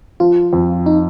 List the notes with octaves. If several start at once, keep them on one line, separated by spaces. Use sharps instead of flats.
F3 F4
F2
D#4